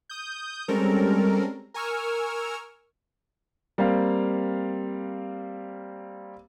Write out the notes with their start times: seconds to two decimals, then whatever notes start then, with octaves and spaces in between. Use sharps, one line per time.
0.09 D#6 G6
0.68 G3 G#3 C4 C#4 A4 A#4
1.74 A#4 G#5 C#6 E6 F6
3.78 G3 A#3 C4 F5